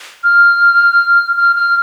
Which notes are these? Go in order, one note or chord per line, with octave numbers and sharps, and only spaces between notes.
F6
F6
F6